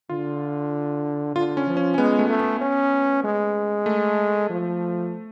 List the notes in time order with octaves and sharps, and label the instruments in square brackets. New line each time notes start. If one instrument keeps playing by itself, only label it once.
[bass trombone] D3 [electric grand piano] F4
[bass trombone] D3 [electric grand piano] F4
[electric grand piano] C#4
[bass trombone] F3
[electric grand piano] C#4
C#4
[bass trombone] G#3 [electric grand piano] B3
[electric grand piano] A3
[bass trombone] A3
[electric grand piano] B3
[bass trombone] C#4
G#3
[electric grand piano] A3
[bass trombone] F3